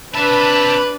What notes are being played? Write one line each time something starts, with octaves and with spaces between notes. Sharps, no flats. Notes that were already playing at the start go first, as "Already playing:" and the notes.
C4 D4 B4 E5 A5 B5